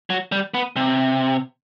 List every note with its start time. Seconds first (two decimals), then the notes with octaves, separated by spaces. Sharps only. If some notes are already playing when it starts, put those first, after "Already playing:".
0.10 F#3
0.32 G3
0.54 B3
0.76 C3